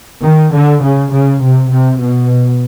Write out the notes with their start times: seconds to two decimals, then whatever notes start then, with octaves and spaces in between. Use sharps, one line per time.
0.24 D#3
0.53 D3
0.83 C#3
1.13 C#3
1.42 C3
1.71 C3
2.01 B2